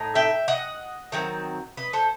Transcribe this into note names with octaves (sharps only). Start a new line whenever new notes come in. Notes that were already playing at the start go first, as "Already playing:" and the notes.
Already playing: A2 D#4
E5 G5
D#5 F#5
D#3 F#3 C4
B4 D#5
A4 C5